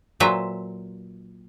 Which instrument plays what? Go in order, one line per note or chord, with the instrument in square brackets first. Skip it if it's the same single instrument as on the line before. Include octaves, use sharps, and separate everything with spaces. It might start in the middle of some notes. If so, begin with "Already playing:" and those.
[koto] A#2 F#3 B4 C5 E5 A#5